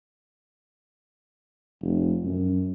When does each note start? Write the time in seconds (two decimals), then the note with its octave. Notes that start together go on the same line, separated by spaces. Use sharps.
1.82 F1
2.24 F#2